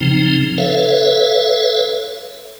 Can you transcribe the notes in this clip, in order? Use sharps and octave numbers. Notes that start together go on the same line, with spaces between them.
C#3 F3 C4 D#4
A4 B4 C#5 E5 F5